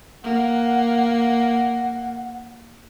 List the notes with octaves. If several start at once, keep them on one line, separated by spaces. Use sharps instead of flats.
A#3 F#5